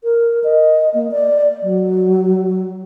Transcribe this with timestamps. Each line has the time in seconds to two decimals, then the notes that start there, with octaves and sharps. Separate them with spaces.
0.04 A#4
0.44 D#5
0.94 A#3
1.11 D5
1.62 F#3